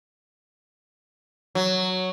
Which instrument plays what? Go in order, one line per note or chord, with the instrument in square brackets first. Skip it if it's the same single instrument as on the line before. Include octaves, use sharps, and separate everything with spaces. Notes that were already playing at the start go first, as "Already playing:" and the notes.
[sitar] F#3